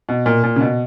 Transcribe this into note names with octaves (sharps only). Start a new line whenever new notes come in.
B2
A#2
A#2
C#3
B2